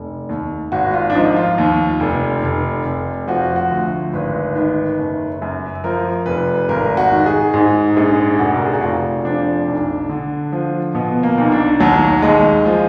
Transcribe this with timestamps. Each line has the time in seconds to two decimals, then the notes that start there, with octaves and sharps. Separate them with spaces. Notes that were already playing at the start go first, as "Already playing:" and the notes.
Already playing: F1
0.29 D#2
0.72 G#1 F#4
0.93 F4
1.10 D4
1.15 F3 D#4
1.36 F4
1.58 D#2
2.00 F1
2.43 F1
2.86 F1
3.28 F3 F#4
3.56 F#4
3.71 D2
4.13 G#1 B4
4.55 D#3 B4
4.98 F#1
5.42 F#2
5.84 F3 A#4
6.26 F1 B4
6.68 G#1 A#4
6.97 F#4
7.12 D#3
7.26 G#4
7.54 G#2
7.96 A#1 G#4
8.39 F1 F#4
8.57 A#4
8.65 G#4
8.74 F#4
8.83 F1 F4
9.25 F3 D4
9.67 B1
10.09 D3
10.52 F3
10.95 B2 B3
11.23 A#3
11.38 B1
11.52 D4
11.80 D#2 F#3
12.22 D#2 G#3
12.66 F3